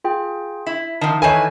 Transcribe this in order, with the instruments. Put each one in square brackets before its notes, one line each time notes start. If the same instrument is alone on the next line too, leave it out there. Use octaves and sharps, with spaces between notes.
[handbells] F4 G#4 G5
[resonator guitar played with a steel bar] E4 [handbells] B6
[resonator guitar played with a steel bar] D#3 F3 [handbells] A5
[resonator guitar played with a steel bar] D#3 E3 B4 [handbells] A4 C#5 [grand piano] G#5